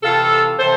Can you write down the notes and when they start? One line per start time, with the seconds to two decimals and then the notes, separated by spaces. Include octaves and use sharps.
0.02 C3 E3 F4 A4
0.58 C3 E3 A4 C5